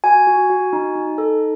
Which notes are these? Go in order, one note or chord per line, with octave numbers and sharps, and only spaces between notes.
F#4 G#5
F#4
F#4
D#4
D#4
A4